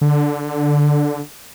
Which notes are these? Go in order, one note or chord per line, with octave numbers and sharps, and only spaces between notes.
D3